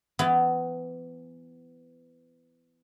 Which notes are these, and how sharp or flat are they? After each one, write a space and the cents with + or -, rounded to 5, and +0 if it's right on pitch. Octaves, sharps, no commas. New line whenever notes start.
E3 +25 B3 +25